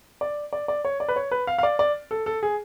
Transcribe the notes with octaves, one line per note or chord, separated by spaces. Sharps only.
D5
D5
D5
C#5
D5
B4
C#5
B4
F5
F5
D5
D5
A4
A4
G#4